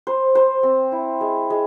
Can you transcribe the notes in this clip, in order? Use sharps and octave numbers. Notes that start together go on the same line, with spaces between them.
C5
C5
C4
E4
G#3
G#3